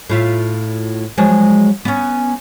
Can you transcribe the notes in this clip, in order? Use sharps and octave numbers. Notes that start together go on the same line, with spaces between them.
A2 F4 E5
F3 F#3 G#3
B3 C#4